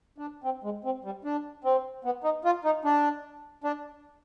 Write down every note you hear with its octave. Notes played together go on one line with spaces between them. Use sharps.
D4
C4
G#3
C4
G3
D4
C4
B3
D#4
F4
D#4
D4
D4